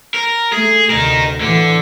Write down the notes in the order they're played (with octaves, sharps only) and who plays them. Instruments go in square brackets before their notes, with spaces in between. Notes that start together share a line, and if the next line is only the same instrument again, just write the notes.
[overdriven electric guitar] A#4
[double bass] A3 [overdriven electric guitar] G#4
[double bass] D2 C3 [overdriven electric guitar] D#4 A#4
[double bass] A2 E3 [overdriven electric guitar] D3